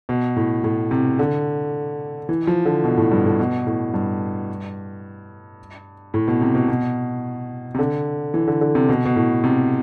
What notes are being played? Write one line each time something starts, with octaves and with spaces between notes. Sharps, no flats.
B2
A2
A2
C3
D3
E3
F3
D3
B2
A2
G2
A2
B2
A2
G2
A2
B2
C3
B2
B2
C3
D3
E3
D3
D3
C3
B2
B2
A2
C3